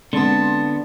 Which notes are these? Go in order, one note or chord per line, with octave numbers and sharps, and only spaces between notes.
D3 G#3 B3 C4 A5 C6